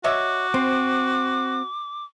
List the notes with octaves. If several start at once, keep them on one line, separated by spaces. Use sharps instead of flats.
F#4 C#5 D#5 E5 D6
C4 C5